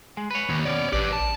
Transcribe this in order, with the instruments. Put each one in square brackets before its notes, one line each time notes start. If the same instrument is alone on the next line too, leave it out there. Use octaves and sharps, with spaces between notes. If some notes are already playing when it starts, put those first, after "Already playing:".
[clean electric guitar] G#3
B4 C#5
[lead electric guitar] D#2
[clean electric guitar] B2 C#4 [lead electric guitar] C#5 D5
[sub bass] A1 [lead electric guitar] G4 B4 [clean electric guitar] D5
[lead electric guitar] A5